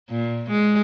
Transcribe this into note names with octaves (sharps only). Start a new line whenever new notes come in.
A#2
G#3